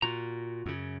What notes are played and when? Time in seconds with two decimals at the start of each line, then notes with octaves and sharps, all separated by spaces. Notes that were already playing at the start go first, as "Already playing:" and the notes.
0.02 A#2 F4 F#4 A#5
0.66 F#2 C#3